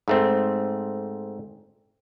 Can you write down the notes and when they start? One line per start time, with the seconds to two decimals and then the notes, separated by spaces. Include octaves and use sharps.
0.08 G#2 A3 C4